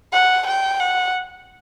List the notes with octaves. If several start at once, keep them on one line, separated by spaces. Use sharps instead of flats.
F#5
G5
F#5